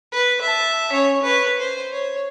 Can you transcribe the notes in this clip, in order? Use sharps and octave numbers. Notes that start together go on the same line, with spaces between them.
B4
E5 A5
C#4 C#5
B4 C#5
C5
C#5